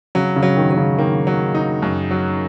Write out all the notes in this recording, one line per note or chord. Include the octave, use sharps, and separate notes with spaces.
C#3 F#3
C#3
F#3
D#3
F#3
C#3
D#3 A#3
F#3
D#4
F#2
F#3